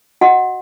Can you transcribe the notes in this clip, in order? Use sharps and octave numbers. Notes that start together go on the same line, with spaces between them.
F#4 D#5 F#5